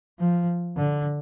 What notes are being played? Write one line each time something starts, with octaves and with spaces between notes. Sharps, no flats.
F3
D3